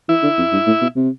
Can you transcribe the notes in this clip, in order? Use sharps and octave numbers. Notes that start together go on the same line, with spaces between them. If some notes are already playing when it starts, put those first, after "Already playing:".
E3 E4
D3
F2
G2
A2
B2
C3